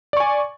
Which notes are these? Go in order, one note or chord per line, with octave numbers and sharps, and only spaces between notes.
D5 G#5 C#6